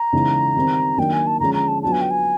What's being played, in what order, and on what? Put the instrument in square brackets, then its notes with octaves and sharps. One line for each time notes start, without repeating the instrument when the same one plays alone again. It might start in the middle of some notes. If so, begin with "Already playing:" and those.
Already playing: [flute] A#5
[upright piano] C#3 E3 G#3 B3 D#4
D#3 G3 C4
[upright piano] D#3 F#3 A#3 D4 [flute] G5
[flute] G#5
A5
[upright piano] D3 F3 G#3 C#4 [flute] A#5
[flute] A#5
A5
[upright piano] F#3 B3 D4 F4 [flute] A5
[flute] G#5
G5
G#5